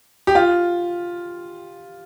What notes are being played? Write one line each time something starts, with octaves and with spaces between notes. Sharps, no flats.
G4
F4